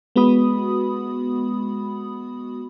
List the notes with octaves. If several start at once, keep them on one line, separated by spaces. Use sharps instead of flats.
G#3 B3 F#4 B5 D#6